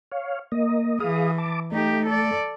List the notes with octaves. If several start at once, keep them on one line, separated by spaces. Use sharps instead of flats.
C#5 F5
A#3 D#5
E3 G#4 F5 D#6
A5 D6
A3 D#4 G4
A4 D5